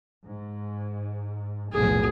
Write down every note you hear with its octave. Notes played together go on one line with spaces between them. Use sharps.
G#2
F1 B1 A2 G#4